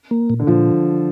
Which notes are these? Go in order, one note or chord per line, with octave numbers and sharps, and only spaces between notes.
A#3
A#2
D3
A#2 F3